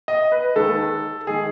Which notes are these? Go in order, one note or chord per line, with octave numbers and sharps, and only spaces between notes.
D#5
B4
D#2 D#3 G#3 A4
D#3 G#3 G#4